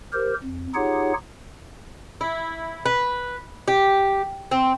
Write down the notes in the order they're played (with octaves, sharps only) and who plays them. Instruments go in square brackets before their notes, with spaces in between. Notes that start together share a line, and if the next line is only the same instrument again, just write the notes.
[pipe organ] G4 A#4 C5
F2
D#4 F4 G4 G#4 C#5 F#5
[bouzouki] E4
B4
G4
C4